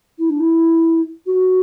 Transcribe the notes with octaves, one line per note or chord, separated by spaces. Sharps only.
E4
D4
E4
F#4